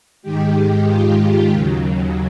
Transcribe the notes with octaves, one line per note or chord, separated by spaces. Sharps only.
G#2 D#3 G#3 G4
F4
D#2 C#3 F#3